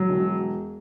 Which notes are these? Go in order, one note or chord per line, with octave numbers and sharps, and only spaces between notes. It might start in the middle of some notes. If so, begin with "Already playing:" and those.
Already playing: F#3
E1